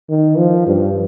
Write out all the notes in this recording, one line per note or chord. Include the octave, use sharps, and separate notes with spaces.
D#3
F3
G2